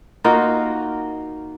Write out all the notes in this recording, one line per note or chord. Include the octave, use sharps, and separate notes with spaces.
A#3 D#4 F4 F#4